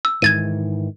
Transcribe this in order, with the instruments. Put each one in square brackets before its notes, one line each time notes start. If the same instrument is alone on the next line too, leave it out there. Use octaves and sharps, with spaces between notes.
[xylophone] E6
[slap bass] G#2 D#3 E3 [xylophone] G#6 A6 D#7